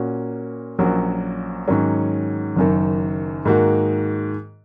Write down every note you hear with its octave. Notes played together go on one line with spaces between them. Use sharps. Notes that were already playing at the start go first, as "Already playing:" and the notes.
Already playing: A#2 A#3 C#4 F#4
A#1 A#2 F#3 C#4 F#4
G#2 D#3 F#3 C#4
F#1 F#2 D#3
G#2 D#3 A#3 F#4